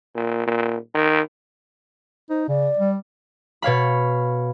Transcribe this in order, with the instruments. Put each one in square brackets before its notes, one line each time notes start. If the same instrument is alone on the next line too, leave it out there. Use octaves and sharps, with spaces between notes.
[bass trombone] A#2
A#2
D#3
[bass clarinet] D#4 [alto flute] C5
[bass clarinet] C#3 [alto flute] D5
[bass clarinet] G3
[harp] B2 C#5 F5 B5